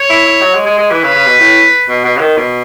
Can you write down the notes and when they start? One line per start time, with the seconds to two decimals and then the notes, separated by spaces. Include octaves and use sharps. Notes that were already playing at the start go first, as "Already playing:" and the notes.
Already playing: C#5
0.10 E4
0.25 E4
0.42 F#3
0.54 G#3
0.66 G#3
0.78 G#3
0.91 E3 B4
1.03 C#3
1.14 C#3
1.27 B2
1.39 A2
1.89 B2
2.05 B2
2.17 C#3
2.20 D#3
2.37 B2